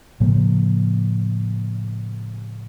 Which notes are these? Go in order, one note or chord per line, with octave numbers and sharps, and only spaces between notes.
A2 C#3 F3 A#3